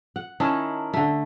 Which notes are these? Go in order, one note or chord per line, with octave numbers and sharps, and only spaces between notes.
F#5
D#3 C#4 E4 A5
D3 A3